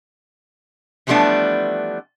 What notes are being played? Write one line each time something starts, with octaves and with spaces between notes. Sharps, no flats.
E3 F3 G3 A3 B3 D4